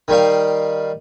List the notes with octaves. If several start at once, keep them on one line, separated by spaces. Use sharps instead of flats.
D#3 G3 F5